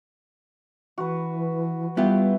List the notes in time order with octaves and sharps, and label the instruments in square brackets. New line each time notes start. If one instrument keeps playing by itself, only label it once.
[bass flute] E3 [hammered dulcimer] F#4 B4
[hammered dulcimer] E3 [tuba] G3 [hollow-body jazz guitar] B3 F4 G4